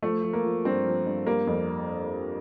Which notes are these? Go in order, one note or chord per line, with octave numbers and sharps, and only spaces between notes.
F3 A3
F3
A#3
F3
G2 C4
F3
G2
G3 A#3
F2